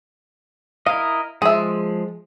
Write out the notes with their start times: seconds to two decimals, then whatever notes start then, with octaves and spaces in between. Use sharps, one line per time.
0.86 E4 A#4 D#5 F5
1.42 F3 G#3 G#4 E5